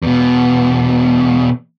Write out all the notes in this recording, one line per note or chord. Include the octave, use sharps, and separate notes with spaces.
E2 B2